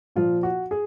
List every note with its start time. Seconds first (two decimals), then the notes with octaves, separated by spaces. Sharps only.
0.16 A#2 F3 F4
0.43 F#4
0.71 G#4